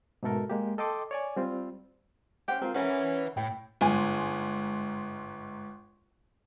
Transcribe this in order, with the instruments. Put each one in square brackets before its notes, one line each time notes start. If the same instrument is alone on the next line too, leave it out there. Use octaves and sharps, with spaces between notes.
[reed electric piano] G#2 B2 A3 A4 A#4
G#3 A#3 G4
A4 D#5 G5 C6 D6
C#5 D5 G#5
G3 C4 F4
[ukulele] C#4 C5 F#5 [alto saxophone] G5
[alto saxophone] C4 [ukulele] F4 A#4
[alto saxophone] C#4 [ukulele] A#4 F#5 [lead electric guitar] B4 E5
[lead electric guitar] A2 [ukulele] G5
[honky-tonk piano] G1 G#2 G#5